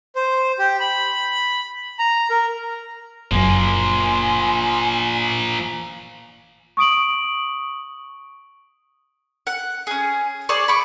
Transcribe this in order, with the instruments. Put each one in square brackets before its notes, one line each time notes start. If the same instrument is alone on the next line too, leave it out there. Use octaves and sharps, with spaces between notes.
[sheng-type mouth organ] C5
G4
B5
A#5
A#4
[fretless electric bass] F#1 F#2 [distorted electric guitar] F3 A#3 [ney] G#5 [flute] C6
[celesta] C#6 D#6 D7 F#7
[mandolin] F#5
C#4 G#4
G#4 C5 D5 C#6
B5 C#6 D6